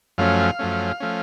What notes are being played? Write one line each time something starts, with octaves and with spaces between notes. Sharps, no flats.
F#2 F3 A3 C#4 F5
F#2 F3 A3 C#4
F3 A3 C#4